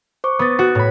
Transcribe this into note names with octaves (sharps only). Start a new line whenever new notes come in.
C5 C#6 D6
B3 D#6 A6
F#4
A2 B5